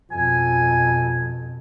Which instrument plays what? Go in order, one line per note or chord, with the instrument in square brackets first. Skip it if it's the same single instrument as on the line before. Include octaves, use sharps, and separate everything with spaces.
[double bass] F2 B2 [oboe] G#5